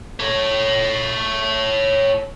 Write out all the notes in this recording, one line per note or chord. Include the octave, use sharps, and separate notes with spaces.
A4 C#5